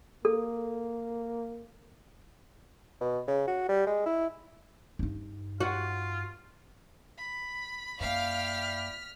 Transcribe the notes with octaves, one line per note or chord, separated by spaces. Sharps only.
A#3 A4
B2
C#3
F#4
G3
G#3
E4
G2 D#4
F4 F#4
B5
F#2 A#3 E4 D5 F5 G5 F6 B6